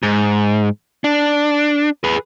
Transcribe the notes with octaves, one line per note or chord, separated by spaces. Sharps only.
G#2
D4
G#4 B4